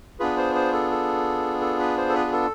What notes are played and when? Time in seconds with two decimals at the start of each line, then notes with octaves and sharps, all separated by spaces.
0.20 B3 D4 F4 G#4 B4
0.37 C5
0.55 C5
0.73 A4
0.91 A4
1.61 A4
1.80 B4
1.98 C5
2.09 A4
2.15 B4
2.27 G#4
2.32 A4